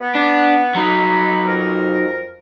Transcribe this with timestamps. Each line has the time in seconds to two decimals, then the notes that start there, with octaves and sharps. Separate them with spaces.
0.01 B3
0.15 D4
0.75 F#3 D#4 A#5 B5
1.45 F2 A#4